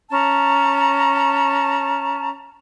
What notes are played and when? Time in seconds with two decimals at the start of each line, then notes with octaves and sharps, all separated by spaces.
0.10 C#4 A5 A#5